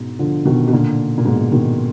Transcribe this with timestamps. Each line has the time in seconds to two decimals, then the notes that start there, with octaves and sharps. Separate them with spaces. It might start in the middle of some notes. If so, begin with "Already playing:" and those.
Already playing: G#2 B2
0.19 D3 F3
0.45 B2 D#3
0.68 B2
0.72 A#2 D3
1.18 A#2
1.25 G#2 B2
1.52 B2 D#3